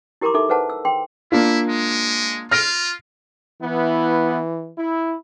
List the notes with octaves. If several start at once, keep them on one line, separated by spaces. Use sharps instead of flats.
E4 G4 A#4 A#5 C6 D6
D#4 A4 E5 D6
G#4 B4 C5 F#5 A5
E6
G#4 G5 C6
A#3 D4 E4 F4
G#3
F4 F6 A#6 D7
E3 B3 E4
E4